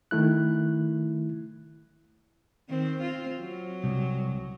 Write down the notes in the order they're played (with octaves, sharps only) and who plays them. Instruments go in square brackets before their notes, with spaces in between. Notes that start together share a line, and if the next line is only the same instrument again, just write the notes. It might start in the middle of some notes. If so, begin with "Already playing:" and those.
[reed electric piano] D#3 A3 E4 F#6
[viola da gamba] D#3 C4
C4 F4
F#3
[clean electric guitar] C2